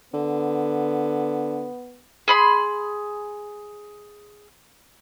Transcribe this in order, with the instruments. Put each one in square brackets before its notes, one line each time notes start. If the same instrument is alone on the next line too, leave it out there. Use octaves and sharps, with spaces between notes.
[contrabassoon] D3 [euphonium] B3
[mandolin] G#4 B5 C6